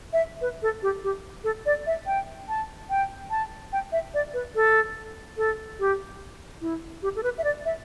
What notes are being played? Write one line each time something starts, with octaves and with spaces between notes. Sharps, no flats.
E5
B4
A4
G4
G4
A4
D5
E5
G5
A5
G5
A5
G5
E5
D5
B4
A4
A4
G4
E4
G4
A4
B4
E5
D5
E5